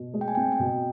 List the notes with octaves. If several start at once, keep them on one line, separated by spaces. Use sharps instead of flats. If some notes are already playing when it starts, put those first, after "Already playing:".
Already playing: B2
G#3
G5
G#5
C4 G5
G5
B2